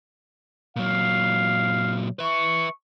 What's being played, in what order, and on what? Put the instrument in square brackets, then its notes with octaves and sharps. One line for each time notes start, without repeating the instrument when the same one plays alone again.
[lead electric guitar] A#2 F#3 [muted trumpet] F5
[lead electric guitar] B4 E5 [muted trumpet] C#6